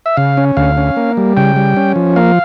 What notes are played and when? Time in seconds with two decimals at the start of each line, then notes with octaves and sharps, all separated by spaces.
0.06 E5
0.17 C#3 F5
0.37 C#4
0.57 D2 F5
0.77 C#4
0.96 A#3
1.17 G3
1.37 C#3 G5
1.56 G3
1.76 C#4
1.96 F3
2.16 A#3 F5